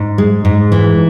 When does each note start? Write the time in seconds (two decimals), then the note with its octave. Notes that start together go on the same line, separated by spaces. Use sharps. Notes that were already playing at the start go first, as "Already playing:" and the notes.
Already playing: G#2
0.18 G#3
0.45 G#2
0.72 E3